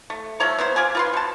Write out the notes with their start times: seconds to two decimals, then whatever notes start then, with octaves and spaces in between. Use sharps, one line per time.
0.10 A3
0.40 F3 A3 C#5 A#5
0.58 B3 E4 C5
0.76 F4 G4 G#5
0.95 F4 B4 C6
1.14 B2 A5